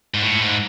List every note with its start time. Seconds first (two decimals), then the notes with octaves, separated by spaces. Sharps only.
0.14 G#2
0.22 A2
0.40 G#2